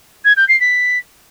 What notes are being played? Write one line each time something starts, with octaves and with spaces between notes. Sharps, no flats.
G#6
G6
C7
B6